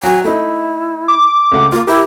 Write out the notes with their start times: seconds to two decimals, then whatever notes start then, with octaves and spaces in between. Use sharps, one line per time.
0.03 F#3 F#4 G#5
0.24 A3 D#4 E4
1.08 D6
1.52 C#2 A3 F#5
1.72 A#3 F4
1.87 E4 G4 A#4